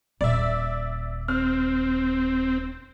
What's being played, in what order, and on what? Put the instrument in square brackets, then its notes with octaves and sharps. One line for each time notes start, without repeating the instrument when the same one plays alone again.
[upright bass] D#1 [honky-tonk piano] D5 E5
[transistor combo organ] C4 [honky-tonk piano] F6